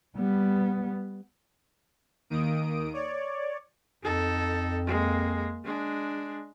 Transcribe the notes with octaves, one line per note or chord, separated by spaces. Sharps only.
G3 B3
D#2 D#3 A#3 D#6 D7
C#5 D5
F2 D#4 A4
G#3 A#3
G#3 D4